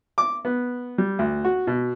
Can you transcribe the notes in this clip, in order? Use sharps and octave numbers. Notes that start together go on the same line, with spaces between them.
D6
B3
G3
D2
F#4
B2